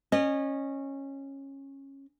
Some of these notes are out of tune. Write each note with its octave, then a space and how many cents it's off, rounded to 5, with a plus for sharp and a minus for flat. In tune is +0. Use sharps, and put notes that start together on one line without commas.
C#4 -15 D#5 -30